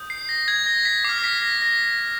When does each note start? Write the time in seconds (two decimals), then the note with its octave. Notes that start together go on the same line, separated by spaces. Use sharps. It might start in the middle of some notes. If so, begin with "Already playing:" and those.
Already playing: D#6 G6
0.10 C7
0.29 A#6
0.48 G#6
0.66 A#6
0.85 B6
1.04 D6 F6 C7
1.18 A#6
1.24 B6
1.42 A#6
1.62 A#6